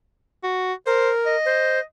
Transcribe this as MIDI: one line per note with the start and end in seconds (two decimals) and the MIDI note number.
0.43 0.73 66
0.86 1.36 70
0.86 1.10 72
1.26 1.81 75
1.46 1.80 72